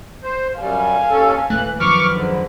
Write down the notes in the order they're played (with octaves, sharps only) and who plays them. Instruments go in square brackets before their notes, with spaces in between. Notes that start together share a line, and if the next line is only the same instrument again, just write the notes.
[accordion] C5
[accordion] F#2 G3 [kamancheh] F5 G#5
[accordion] D#2 C#4 A4
[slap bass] D#1 A3 [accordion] E3 F#6
[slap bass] F#2 D#3 F3 [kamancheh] B4 [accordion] C#6 D6 F6
[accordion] G#2 D3